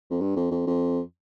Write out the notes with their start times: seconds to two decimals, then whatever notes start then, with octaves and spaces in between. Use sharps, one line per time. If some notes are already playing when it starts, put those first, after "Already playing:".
0.10 F2
0.20 G2
0.36 F2
0.51 F2
0.67 F2